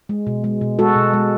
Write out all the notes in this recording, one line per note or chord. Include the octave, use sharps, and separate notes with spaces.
G#3
B2
G#3
B2
G#3 F#4 A4
B2
G#3